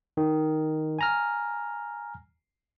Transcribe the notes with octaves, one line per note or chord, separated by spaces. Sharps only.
D#3
G#5 A#5 F6